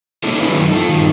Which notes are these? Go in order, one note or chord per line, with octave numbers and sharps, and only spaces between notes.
A3 A#3 C#4 D#4 E4 A4
D#3 F3 F#3 G#3 E4 B4
F#2 D#3
F4 A4
G2 D#3